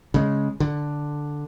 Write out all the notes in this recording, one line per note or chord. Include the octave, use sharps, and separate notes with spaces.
C#3 G#3
D3